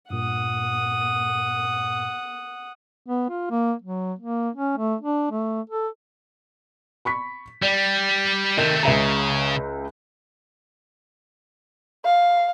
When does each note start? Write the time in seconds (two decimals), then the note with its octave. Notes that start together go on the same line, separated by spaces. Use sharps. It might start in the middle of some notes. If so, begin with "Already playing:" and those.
0.10 G2 A#2 F#5 D#6
3.06 B3
3.29 F4
3.51 A#3
3.82 F#3
4.19 A#3
4.56 C#4
4.77 A3
5.01 D4
5.31 A3
5.69 A4
7.05 B5 C#6 B6
7.62 G3 D5
8.57 C3 D#3 A3 G6
8.83 C#2 C#3 E5 A#5
12.05 F5